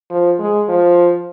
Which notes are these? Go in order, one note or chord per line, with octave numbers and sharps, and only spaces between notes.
F3
G#3
F3